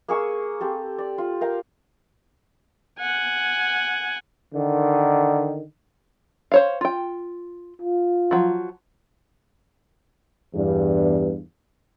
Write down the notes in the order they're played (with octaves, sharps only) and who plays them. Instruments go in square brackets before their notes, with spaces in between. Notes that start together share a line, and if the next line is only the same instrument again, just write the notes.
[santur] A#3 G#4 C#6 E6
C4 G4 A4
D5
F4
A#4 F5 G5
[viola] F#5 G#5
[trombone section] D3 D#3
[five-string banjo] C5 C#5 F5
F4 G5
[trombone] F4
[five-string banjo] F3 F#3
[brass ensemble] E2 G2